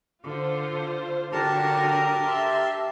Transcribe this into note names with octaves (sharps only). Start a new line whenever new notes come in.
D3 F4 C5
D3 D4 F#4 G4 A#4 A5
E5 C6